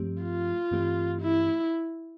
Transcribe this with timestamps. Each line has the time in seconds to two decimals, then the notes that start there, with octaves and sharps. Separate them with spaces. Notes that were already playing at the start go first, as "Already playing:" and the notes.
Already playing: G2 F3 A3 C4 G4
0.23 F4
0.71 G2 E3 A3 C4 G4
1.21 E4